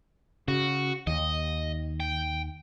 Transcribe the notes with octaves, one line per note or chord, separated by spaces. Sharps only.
C#3 F#4
D#2 D#5
G5